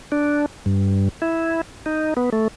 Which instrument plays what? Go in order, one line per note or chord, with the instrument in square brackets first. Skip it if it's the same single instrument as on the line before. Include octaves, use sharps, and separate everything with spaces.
[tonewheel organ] D4
G2
E4
D#4
B3
A3